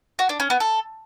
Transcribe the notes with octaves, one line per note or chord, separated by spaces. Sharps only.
F#4
D4
C#4
B3
A4